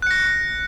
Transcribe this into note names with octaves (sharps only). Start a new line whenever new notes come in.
F#6 A#6 C#7